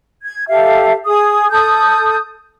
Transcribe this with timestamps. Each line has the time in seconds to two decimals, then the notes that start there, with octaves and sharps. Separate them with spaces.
0.23 G#6
0.48 G4 A4 E5 F5
1.05 G#4 D#6
1.51 A4 D#6 G6